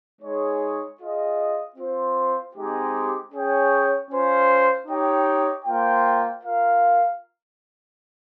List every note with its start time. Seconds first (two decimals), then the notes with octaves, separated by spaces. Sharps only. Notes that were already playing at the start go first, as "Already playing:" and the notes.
0.21 G#3 D#4 G#4 C#5
0.99 F4 G#4 D#5
1.76 C4 F4 C5
2.54 G#3 C4 D#4 G4
3.32 C#4 G#4 C#5 G5
4.09 C#4 F4 C5
4.87 D#4 G4 C#5 G5
5.65 A#3 F4 C5 G5
6.43 F4 A#4 F5